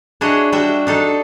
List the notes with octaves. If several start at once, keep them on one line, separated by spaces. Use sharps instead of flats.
D4 E4 F#4 G#4 C#5 D#5
G3 D4 F#4 E5 G5
D4 D#4 A4